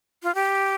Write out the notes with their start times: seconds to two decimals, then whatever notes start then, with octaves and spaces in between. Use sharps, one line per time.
0.23 F4
0.35 G4